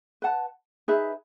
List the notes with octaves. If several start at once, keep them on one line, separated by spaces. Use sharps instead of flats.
B4 F#5 A5
D#4 G#4 B4 E5